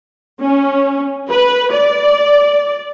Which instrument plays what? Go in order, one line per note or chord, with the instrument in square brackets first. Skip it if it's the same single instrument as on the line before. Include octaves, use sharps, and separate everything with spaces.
[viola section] C#4
B4
D5